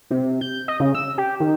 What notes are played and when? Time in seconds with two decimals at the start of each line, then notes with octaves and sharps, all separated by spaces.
0.11 C3
0.41 G6
0.68 D#5
0.80 C#3
0.95 E6
1.18 G4
1.40 D#3